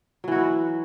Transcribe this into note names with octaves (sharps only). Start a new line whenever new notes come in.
E3 F#3 E4 F#4